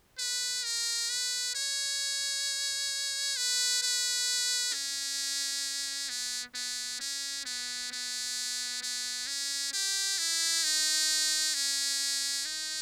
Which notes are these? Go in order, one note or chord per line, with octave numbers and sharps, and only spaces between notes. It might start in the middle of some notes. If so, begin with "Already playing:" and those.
B4
A#4
B4
C#5
B4
B4
C#4
B3
B3
C#4
B3
B3
B3
C#4
G4
E4
D#4
C#4
D#4